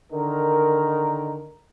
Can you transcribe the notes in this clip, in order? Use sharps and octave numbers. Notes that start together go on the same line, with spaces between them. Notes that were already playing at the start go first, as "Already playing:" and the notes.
D3 D#3 A#4